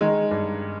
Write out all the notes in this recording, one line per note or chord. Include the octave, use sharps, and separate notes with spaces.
D#3 G#3
G2